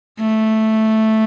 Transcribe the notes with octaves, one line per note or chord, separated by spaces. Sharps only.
A3